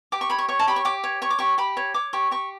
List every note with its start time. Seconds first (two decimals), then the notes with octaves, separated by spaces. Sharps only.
0.12 G4 D6
0.21 C#6
0.30 C#5 B5
0.38 C#6
0.48 C#5 C#6
0.59 A5
0.67 G4 B5
0.76 C#6
0.85 G4 D6
1.04 C#5
1.22 C#5 C#6
1.30 D6
1.39 G4 C#6
1.58 G4 B5
1.77 C#5
1.94 C#5 D6
2.13 G4 C#6
2.31 G4 C#6